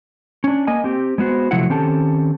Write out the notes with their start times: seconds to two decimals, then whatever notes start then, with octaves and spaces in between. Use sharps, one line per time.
0.44 C#4 D4
0.67 A#3 D#5 G#5
0.84 C4 G4
1.18 G#3 B3 F#4 C5
1.51 C3 F3 F#3 A3 E4 F#5
1.70 D#3 C4 C#4 G4 A4 A5